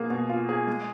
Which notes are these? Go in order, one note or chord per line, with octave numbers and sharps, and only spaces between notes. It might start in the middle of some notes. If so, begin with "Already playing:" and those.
Already playing: B2 A#3 F4 G#4
B2
F4
G#4
G#3